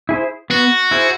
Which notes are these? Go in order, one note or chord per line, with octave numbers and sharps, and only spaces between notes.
E4 G#4 C5
B3 F#4
E4 G#4 C5